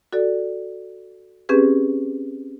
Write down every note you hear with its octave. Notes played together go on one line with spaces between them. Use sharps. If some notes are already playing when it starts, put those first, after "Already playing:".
F#4 A4 D5
C4 C#4 G4 G#4 B4